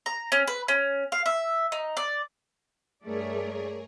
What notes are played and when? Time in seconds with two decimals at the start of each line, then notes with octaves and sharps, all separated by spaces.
0.06 A#5
0.32 C#4
0.48 B4
0.68 C#4
1.12 F5
1.26 E5
1.72 D#4
1.97 D5
3.03 G2 A3 G#4 A#4 C#5 D5